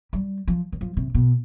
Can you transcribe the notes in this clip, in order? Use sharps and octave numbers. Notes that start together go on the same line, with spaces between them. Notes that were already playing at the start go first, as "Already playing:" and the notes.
G3
F3
D#3
F3
C3
B2